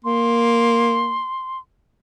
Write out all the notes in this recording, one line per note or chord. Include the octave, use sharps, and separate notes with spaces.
A#3 C6